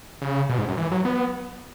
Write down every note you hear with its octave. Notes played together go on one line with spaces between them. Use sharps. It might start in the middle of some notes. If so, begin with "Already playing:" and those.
C#3
B2
G#2
F#2
E3
F#3
B3